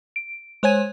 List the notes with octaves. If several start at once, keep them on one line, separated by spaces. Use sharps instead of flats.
D7
G#3 C5 C#5 G#5 G#6 D#7